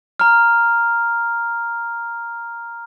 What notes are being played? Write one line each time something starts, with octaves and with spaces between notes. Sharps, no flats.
A#5 F6